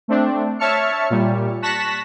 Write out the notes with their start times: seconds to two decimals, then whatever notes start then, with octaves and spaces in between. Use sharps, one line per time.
0.08 A3 C4 D4
0.59 C#5 E5 A5 C#6 F6 C#7
1.10 A#2 G3
1.62 A5 C#6 F#6 A#6 B6 E7